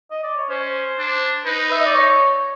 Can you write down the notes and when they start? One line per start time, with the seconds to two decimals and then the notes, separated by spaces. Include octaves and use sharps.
0.11 D#5
0.23 D5
0.37 C#5
0.50 C#4 C5
0.99 D4
1.46 D#4 B4
1.72 E5
1.80 D#5
1.86 D5
1.94 C#5